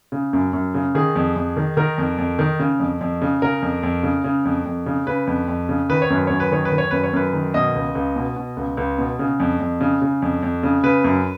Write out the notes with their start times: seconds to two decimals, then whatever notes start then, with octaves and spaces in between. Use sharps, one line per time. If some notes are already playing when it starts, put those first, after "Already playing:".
0.12 C#3
0.33 F#2
0.53 F#2
0.74 C#3
0.95 D#3 G#4
1.16 F2
1.36 F2
1.57 D#3
1.77 D#3 A#4
1.98 F2
2.18 F2
2.39 D#3
2.60 C#3
2.80 F2
3.01 F2
3.22 C#3
3.42 C#3 A#4
3.62 F2
3.83 F2
4.03 C#3
4.24 C#3
4.45 F2
4.65 F2
4.86 C#3
5.07 C#3 B4
5.27 F2
5.48 F2
5.69 C#3
5.89 D#3 B4
6.02 C#5
6.10 F#2 B4
6.27 F#2 C#5
6.40 B4
6.52 D#3 C#5
6.65 B4
6.72 D#3
6.78 C#5
6.91 F#2 B4
7.03 C#5
7.13 F#2 B4
7.33 D#3
7.54 B2 D#5
7.75 C#2
7.95 C#2
8.16 B2
8.37 B2
8.57 C#2
8.77 C#2
8.98 B2
9.19 C#3
9.40 F2
9.60 F2
9.81 C#3
10.01 C#3
10.22 F2
10.43 F2
10.63 C#3
10.83 C#3 B4
11.04 F#2